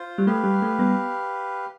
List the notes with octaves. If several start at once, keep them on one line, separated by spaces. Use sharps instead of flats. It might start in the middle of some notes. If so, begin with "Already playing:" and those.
Already playing: F4 C5
G3
A3 G4 B4 F5
G3
A3
G3 B3